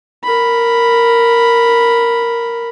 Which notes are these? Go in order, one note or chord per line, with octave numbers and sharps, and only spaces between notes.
A#4 B5